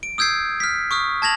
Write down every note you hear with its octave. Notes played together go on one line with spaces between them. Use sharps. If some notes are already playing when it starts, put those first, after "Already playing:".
D7
D#6 E6 G6 G#6 C7
F6 B6
C#6 D#6 F6
A5 G#6 A#6 F7 F#7